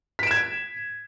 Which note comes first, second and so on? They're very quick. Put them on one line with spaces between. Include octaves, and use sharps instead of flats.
B6 D7 E7 G#6